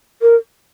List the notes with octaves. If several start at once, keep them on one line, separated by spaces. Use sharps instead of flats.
A#4